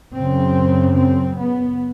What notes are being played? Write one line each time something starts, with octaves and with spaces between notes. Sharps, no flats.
F#2 C#3 C4
C4
B3